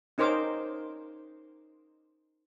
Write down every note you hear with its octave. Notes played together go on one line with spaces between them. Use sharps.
C#4 D#4 A#4 C5 D6